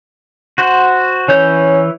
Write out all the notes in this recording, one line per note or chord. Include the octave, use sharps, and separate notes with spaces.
F#4 C5 F#5
E3 C#4 C#5 G6